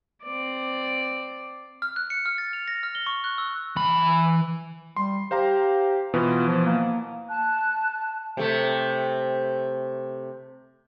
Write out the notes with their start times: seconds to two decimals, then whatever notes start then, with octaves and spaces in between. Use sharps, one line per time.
0.23 C4 D5
1.82 F6
1.96 F#6
2.10 C#7
2.26 F6
2.38 A6
2.53 F7
2.68 A#6
2.83 F6
2.95 G7
3.07 C#6
3.24 F#6
3.38 E6
3.76 E3 B5
4.96 G3 C6
5.31 G4 C5 F5 A#5
6.14 B2 E3 B3 F4
6.47 F3
6.66 A#3
7.29 A5 F#6
8.37 C3 A3